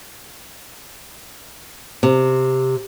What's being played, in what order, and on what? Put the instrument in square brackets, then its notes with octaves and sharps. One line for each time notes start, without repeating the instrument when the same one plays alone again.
[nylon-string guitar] C3